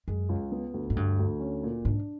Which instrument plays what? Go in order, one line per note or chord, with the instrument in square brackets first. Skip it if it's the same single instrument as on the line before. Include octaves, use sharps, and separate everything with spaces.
[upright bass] F#2 [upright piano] G#3
[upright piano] C#2
B3
D2
[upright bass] G#2
[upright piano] D2 [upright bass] G2
[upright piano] D2
C#4
A#2
[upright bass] G#2 [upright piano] D4